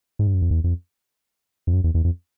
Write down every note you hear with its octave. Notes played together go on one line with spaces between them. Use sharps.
G#2
G2
F#2
F2
E2
F2
F2
F#2
E2
E2
F2